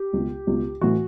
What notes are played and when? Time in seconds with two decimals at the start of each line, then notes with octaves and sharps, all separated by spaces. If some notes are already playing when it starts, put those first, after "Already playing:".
Already playing: G4
0.13 C#2 B2
0.47 C#2 B2
0.81 A2 E3 F#4